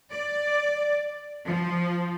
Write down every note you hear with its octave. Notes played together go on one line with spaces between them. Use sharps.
D5
F3